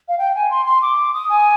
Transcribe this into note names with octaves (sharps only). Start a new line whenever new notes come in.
F5
G5
G#5
C6
C6
D6
D#6
G#5